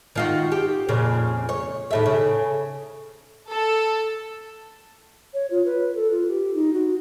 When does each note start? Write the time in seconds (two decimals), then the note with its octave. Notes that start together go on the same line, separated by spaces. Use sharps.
0.16 D#3 F4 F#4
0.52 G4
0.88 F2 A#2 C#3
1.49 C#5
1.91 D#2 A2 E5
2.06 C#3
3.49 A4
5.33 C#5
5.50 F4
5.65 B4
5.95 A4
6.10 F4
6.27 G4
6.54 D#4
6.73 F#4